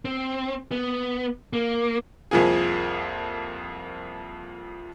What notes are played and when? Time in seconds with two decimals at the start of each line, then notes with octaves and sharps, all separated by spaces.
0.05 C4
0.71 B3
1.53 A#3
2.31 C2 F2 F3 A#3 G#4